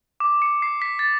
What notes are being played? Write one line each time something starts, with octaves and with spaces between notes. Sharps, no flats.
D6
C#7
C7
B6
A6